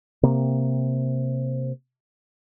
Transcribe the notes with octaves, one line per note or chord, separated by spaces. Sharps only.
C3 A#3